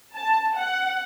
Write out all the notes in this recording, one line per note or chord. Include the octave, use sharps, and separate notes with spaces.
A5
F#5